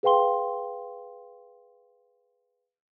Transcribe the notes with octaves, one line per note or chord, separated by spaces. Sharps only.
G#4 B4 F5 G5 C6 G7